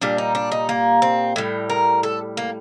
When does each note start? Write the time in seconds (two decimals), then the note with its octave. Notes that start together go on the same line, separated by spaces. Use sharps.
0.02 A#2 G3 D4
0.18 D#4
0.35 D4
0.52 D#4
0.69 A#3
1.02 C4
1.36 A2 G3
1.70 A#4
2.03 A4
2.37 A#3